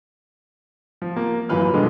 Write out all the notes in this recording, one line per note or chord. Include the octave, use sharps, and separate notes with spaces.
F3
A#3
F#2 E3 F4 B4 F6
B2 D3 F3 G3 G#3